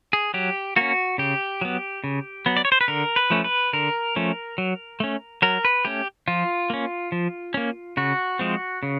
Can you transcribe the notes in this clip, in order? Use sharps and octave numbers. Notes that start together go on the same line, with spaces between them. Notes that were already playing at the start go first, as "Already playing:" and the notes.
G#4
F#3 G4
A#3 C#4 F#4
C#3 G4
F#3 B3
C#3
F#3 B3
D5
C#5
C5
B4
D3 A#4
B4
F3 A3 C#4
B4
D3 A#4
F3 A3 C#4
F#3
A3 C#4
F#3 A#4
B4
A3 C#4 G4
F3 F4
A#3 C#4
F3
A#3 C#4
C#3 F#4
F3 G#3 C4
C#3